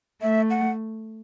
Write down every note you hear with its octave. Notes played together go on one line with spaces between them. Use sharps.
A3 E5
F#5